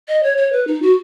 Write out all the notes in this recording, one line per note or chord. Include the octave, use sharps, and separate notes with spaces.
D#5
C#5
C#5
B4
D#4
F#4